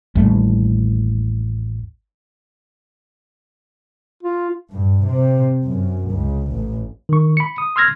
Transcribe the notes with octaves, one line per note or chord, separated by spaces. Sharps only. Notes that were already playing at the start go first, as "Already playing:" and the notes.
A1 D#2 G3 A3
F4
G2
C3
F#2
C#2
A1
D#3 C#6
B5 C#7
D#6
C6 E6 F6 G#6 A#6